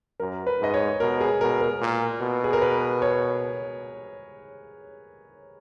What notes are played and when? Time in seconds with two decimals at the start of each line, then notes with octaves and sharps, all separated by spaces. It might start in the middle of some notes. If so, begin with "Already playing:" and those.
0.20 F#2 A#4
0.47 B4
0.60 G#2 D#5
0.74 C#5
1.00 B2 A#4
1.21 G#4
1.41 B2 A#4
1.61 A#4
1.81 A#2
2.21 B2
2.44 G#4
2.53 A#4
2.62 B4
3.02 C#5